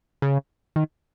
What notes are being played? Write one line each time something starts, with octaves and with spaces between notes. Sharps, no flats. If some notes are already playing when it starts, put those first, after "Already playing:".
C#3
D#3